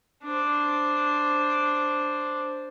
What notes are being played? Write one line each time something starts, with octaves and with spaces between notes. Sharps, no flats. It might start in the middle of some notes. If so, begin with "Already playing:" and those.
D4 C5